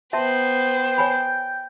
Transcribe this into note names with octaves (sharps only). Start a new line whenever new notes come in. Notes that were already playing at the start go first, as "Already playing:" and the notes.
B3 C5 E5 G5 A5 C6
C#5 G#5 B5